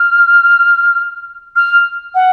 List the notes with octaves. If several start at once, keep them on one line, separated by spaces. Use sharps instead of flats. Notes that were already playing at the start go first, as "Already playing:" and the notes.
Already playing: F6
F6
F#5